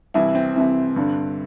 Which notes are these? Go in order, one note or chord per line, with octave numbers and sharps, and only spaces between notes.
C2 C3 E3 E4
C4
C2 C3 E3
G2 D3